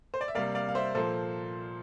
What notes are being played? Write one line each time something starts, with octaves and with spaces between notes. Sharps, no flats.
C5
D5
E5
C3 G3 A#3 D5 F5
D5 F5
F5
C5 E5
A#2 F3 A#3 A4 C5